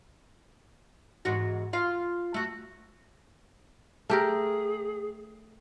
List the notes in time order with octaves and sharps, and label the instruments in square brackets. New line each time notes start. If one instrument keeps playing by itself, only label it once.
[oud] E2 G#2 F#4
F4 F5
A3 F#4
[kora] A3 G4 A#4 [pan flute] G#4